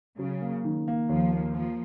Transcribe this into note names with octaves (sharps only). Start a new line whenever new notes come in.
C#3 F#3
A#3
D#3
A#3
D#2 F3
A#3
F3 A#3